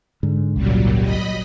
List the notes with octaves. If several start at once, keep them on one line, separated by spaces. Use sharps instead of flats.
G#2 D3
G#1 C#2 A#2 F#3 G3
D#5 B5